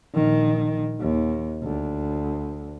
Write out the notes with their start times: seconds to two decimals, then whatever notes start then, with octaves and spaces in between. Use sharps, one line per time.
0.14 A#1 D#3
1.01 D#2
1.63 D2